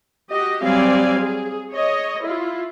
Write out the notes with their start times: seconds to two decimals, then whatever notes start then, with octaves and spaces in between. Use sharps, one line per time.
0.31 F#4 G4 D#5
0.62 F#3 G3 C4 D5 F5 G#5
1.19 G#4
1.71 C#5 D#5
2.22 E4 F4